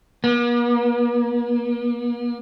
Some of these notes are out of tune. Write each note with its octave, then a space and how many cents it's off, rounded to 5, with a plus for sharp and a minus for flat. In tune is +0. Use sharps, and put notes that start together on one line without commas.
A#3 +45